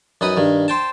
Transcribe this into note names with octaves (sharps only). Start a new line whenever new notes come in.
F#2 D#4 B4 D#6
G2 D#3
C5 G5 A5